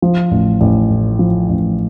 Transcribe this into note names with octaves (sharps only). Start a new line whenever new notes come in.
F3
A1
A1
A2
F3
A1